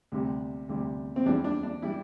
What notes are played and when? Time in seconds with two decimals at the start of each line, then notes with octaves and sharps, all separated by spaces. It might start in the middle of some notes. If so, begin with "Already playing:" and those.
0.12 D2 C3 G3
0.69 D2 C3 G3
1.16 C4
1.25 E2 E3 G3 D4
1.44 D4
1.63 D4
1.82 E3 G3 E4